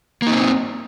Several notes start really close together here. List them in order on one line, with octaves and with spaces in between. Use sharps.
A#3 D#4 C4